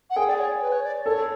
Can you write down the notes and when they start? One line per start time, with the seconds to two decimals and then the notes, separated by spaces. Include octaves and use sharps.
0.10 F#5
0.16 G#4 G5
0.28 D5
0.39 C#5
0.61 B4
0.72 C#5
0.84 D5
1.05 A4 C#5